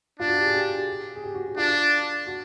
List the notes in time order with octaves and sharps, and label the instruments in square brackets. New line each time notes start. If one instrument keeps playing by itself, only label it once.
[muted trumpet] D4 [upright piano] F4
[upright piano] F#4
G4
G#4
G4
G#4
G4
F#4
F#4
[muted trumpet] D4 [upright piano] F4
[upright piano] F#4